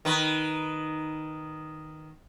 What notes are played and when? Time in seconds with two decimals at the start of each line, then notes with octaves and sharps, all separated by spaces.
0.05 D#3 B4